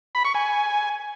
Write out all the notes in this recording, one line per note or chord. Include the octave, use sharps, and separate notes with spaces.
B5
C#6
G#5